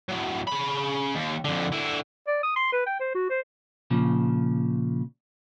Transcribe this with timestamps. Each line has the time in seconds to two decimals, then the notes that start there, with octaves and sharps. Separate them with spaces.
0.09 A2 F#3
0.47 C#3 B5
1.15 D#2
1.45 F2 D3
1.72 D3 E4
2.27 D5
2.43 D#6
2.56 C6
2.72 B4
2.86 G5
3.00 C5
3.15 F#4
3.30 C5
3.90 A#2 C#3 F3